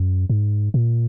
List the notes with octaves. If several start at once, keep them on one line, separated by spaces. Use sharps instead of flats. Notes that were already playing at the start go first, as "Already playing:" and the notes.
Already playing: F#2
G#2
A#2